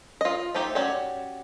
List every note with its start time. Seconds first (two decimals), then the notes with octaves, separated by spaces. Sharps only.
0.21 F4 D#5
0.54 F3 A3 D#4 G4
0.75 C#4 F#4 G4 D5